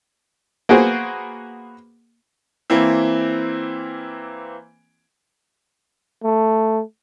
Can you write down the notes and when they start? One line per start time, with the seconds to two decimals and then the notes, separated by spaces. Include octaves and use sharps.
0.69 A#3 B3 F#4 G#4 C5
2.70 E3 A#3 C4 E4
6.24 A3